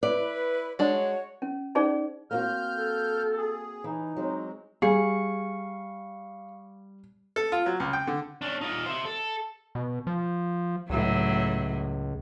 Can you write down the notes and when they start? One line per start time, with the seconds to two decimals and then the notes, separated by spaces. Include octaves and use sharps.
0.03 E4 B4 D5
0.79 G#3 D4 F#4 C#5
1.42 C#4
1.75 C#4 D#4 G#4 C5 D5
2.31 A#3 C4 F#4 F6 G6
2.76 A4
3.37 G#4
3.84 E3 D#4
4.16 F#3 G#3 C4
4.82 G3 G#4 F5 C#6 C#7
7.36 A4
7.52 F4
7.66 F#3
7.80 C#2
7.93 G5
8.07 D3
8.42 C#4 D4
8.61 D#4 F4
8.86 C5 E5
9.05 A4
9.75 B2
10.07 F3
10.90 C#2 A2 F#3